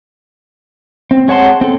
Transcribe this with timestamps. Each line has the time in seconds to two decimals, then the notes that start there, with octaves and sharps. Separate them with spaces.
1.11 C4
1.28 G#3 C#5 F#5 A5 C6
1.61 C4 A4